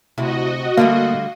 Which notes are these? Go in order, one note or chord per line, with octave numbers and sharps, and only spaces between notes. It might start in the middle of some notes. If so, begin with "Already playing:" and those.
D2 C3 E4 F#4 D#5
D3 G3 A3 A#3 F5